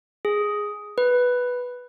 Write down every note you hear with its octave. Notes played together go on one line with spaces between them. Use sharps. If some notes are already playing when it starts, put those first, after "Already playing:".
G#4
B4